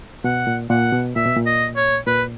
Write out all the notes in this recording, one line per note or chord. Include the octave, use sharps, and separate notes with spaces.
B2 F#5
A#2
A#2 F#5
B2
A#2 E5
B2
A#2
D#5
C#5
A#2 B4